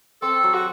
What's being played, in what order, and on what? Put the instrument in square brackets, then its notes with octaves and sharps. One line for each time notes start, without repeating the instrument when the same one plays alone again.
[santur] C4 [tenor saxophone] A4
[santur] F#3
[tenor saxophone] F#4